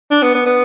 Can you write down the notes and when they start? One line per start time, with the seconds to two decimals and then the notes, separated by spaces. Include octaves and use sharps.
0.11 D4
0.23 B3
0.35 B3
0.46 B3